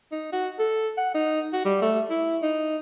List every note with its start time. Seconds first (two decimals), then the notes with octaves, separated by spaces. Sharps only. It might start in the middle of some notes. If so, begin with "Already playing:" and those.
0.12 D#4
0.32 F#4
0.59 A4
0.98 F#5
1.15 D#4
1.53 F#4
1.65 G3
1.82 A3
2.10 E4
2.43 D#4